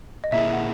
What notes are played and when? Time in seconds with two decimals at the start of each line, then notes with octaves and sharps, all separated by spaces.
0.24 D#5
0.32 A#2 A#3 E4 G#4 E5
0.53 F#5